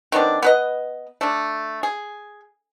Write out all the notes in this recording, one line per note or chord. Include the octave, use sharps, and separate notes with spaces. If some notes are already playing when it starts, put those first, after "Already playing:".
D#3 B3 C4 D4
B3 B4 D#5
A3 D4
G#4